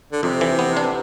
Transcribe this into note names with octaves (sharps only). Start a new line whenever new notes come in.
D3
F2 C3
E3
B3
D4